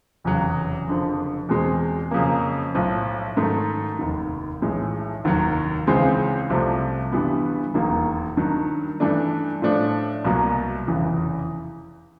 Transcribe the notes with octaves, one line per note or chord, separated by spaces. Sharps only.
F1 E2 C#3 F#3
F#1 F2 D3 F3
E2 B2 G#3 C4
F2 C#3 F#3 A#3
B1 A2 F3
G#2 D#3 F#3 A3
F1 D#2 D#3
B1 A2 E3 G#3
F1 D#2 D#3 F#3
C#2 C#3 E3 G#3 C4
C2 C3 F3 A3
G1 G2 E3 G3 B3
E1 D#2 D#3 F#3 A#3
G2 D#3 F#3
G2 E3 A3 D4
A2 F3 A3 D4
C2 B2 F#3 A#3
F1 E2 C#3 E3